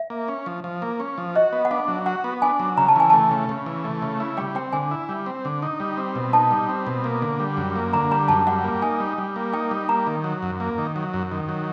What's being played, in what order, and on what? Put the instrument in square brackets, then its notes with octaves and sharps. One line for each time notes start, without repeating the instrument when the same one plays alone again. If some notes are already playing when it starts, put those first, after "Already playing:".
Already playing: [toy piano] E5
[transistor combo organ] A#3
C#4
F3
F3
A#3
C#4
F3
[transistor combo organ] F#4 [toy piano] D#5
[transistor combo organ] B3
[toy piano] F#5
[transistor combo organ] D4 [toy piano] F5
[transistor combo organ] F#3
[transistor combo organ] F#4 [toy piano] F#5
[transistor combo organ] B3
[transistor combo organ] D4 [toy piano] G#5
[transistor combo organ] F#3
[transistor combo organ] C#3 [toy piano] A#5
[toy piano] A5
[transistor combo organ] E3 [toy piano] G#5
[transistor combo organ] A3 [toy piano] A5
[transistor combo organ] C#3
C#3
E3
A3
C#3
E4
[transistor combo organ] G3 [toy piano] G5
[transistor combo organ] C4 [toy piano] G5
[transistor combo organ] D3 [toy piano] G#5
[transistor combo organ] E4
G3
C4
D3
D#4
G3
C4
B2
[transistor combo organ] D#4 [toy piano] A5
[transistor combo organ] G3
C4
B2
A#3
D3
G3
F#2
A#3
[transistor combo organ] D3 [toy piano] A#5
[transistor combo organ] G3 [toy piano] A#5
[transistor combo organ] F#2 [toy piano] A5
[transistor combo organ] G3 [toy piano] F#5
[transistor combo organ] A#3
[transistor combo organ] D#4 [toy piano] G#5
[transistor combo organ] G3
G3
A#3
[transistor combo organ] D#4 [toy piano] G5
[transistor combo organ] G3
[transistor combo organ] A#3 [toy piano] A#5
[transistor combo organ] D#3
F#3
F#2
A#3
D#3
F#3
F#2
D#3
F#3